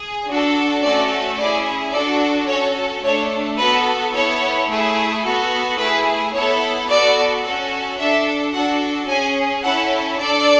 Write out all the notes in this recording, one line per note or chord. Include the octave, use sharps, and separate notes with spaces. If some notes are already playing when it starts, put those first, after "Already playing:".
Already playing: G#4
D4 F#4 A4
A3 C#4 F#4 A4 D5
C#4 E4 G#4 D5
D4 F#4 A4 D5
C#4 F#4 A4 C#5
A3 D4 A4 C#5
B3 F#4 A4 B4
B3 E4 A4 C#5
A3 E4 G#4
B3 F#4 A4
A3 E4 G#4 B4
B3 E4 A4 C#5
B3 F#4 A4 D5
C#4 F#4 A4
D4 A4 E5
D4 F#4 A4 F#5
C#4 G#4 G#5
C#4 E4 A4 F#5
D4 A4 D5